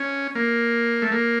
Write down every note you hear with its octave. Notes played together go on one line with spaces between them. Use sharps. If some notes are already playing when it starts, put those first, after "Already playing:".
Already playing: C#4
A#3
A3
A#3